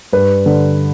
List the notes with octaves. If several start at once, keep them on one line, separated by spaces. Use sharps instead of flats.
G2 B4
D3